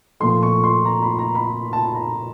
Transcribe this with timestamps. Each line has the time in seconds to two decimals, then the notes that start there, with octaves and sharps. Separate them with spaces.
0.20 A#2 F3 A3 C6
0.43 C#6
0.64 C6
0.85 A#5
1.03 B5
1.19 A#5
1.35 B5
1.73 A5
1.95 A#5